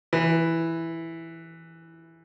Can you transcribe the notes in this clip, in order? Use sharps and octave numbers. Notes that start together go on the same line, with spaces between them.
E3